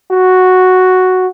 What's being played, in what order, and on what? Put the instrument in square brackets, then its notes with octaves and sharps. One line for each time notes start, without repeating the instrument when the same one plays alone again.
[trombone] F#4